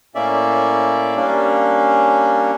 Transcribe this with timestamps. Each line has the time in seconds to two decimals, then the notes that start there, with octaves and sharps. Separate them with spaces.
0.15 A2 A#3 C#4 D5 E5
1.16 G3 A#3 C#4 D4